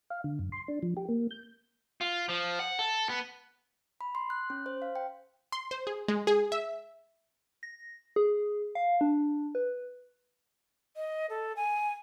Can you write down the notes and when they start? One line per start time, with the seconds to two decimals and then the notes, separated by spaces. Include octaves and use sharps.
0.10 F5
0.24 D3
0.39 F#2
0.52 C6
0.68 D4
0.83 F3
0.97 G4
1.09 A#3
1.31 G6
2.01 F4
2.29 F3
2.59 F#5
2.79 A4
3.09 B3
4.01 B5
4.15 C6
4.30 F#6
4.50 C#4
4.66 C5
4.82 F5
4.96 G5
5.52 C6
5.71 C5
5.87 G#4
6.08 G#3
6.27 G#4
6.52 E5
7.63 A#6
8.16 G#4
8.75 F5
9.01 D4
9.55 B4
10.96 D#5
11.30 A4
11.56 G#5